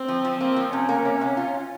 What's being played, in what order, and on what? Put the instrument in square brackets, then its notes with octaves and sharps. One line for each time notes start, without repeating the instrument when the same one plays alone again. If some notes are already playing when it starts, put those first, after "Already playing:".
Already playing: [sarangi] C4
[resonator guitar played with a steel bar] F3
F3
[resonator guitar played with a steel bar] A#3 [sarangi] C4
[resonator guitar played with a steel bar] F3
[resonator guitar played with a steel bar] C3 [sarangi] C#4
[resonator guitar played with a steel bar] A#3
C3
C3
F4
F4